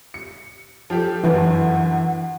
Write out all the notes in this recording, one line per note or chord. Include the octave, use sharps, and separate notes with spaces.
C#7
F3 G4 A4
G1 F#2 E3 F#5